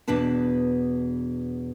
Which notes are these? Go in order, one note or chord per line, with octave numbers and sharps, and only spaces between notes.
E2 B2 D4 B4 A5